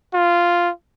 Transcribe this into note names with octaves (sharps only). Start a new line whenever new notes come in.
F4